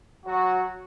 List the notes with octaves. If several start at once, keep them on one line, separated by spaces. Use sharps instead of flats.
F#3 F#4